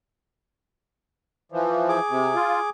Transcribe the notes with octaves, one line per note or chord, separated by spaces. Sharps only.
E3 F3
G#4 D6
C3
F4